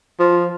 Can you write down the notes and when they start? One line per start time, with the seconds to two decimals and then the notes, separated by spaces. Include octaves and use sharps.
0.20 F3